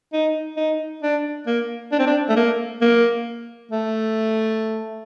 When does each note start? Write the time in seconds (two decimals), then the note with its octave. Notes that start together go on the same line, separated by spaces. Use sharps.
0.13 D#4
0.57 D#4
1.02 D4
1.47 A#3
1.92 D4
1.99 C4
2.07 D4
2.29 A3
2.36 A#3
2.81 A#3
3.71 A3